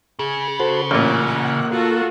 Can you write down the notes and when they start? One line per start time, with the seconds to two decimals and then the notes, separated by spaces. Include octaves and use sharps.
0.19 C#3 G#4
0.60 F#4 A4 C5
0.91 A1 A#2 C#4 F#5
1.24 A#3
1.71 F4 F#4 A4